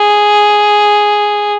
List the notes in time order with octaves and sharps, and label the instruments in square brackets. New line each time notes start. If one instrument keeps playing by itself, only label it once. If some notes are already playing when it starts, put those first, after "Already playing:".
Already playing: [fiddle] G#4